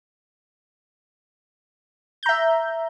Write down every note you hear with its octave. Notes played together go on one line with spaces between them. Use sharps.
E5 A#5 G6